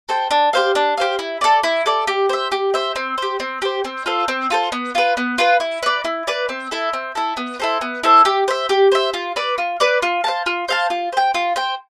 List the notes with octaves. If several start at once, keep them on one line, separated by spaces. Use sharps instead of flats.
A4 C5 G5
D4
G4 C5 F5
D4
G4 C5 F5
E4
A4 D5
E4
A4 D5
G4
C5 E5
G4
C5 E5
C4
G4 C5
C4
G4 C5
C4
F4 A4 C5
C4
F4 A4 C5
B3
F4 B4
B3
F4 B4
E4
B4 D5
E4
B4 D5
C4
E4 A4
C4
E4 A4
B3
E4 A4 C5
B3
E4 A4 C5
G4
C5 E5
G4
C5 E5
F4
B4 D5
F4
B4 D5
F4
C5 F5 A5
F4
C5 F5 A5
F4
C5 G5
F4
C5 G5